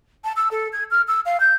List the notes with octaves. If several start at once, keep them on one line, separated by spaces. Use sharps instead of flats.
A5
E6
A4
G#6
F6
E6
F5
G6